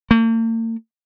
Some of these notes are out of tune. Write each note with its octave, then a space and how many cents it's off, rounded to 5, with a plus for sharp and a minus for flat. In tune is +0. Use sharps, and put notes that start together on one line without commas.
A#3 -45